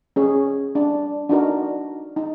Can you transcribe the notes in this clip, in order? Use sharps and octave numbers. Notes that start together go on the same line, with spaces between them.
C#4 G#4 C#5
D4
D4 D#4 F#4 A#4
D#4